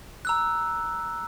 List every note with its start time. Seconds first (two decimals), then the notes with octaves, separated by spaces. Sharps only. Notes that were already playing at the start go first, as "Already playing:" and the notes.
0.25 A#5 E6 F#6